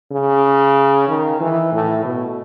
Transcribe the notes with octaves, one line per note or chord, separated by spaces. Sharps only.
C#3
D#3
E3
A2
B2